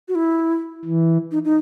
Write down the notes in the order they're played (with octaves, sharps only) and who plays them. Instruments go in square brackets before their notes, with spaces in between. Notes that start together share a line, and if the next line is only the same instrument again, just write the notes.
[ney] F#4
E4
[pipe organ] E3
[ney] D#4
D#4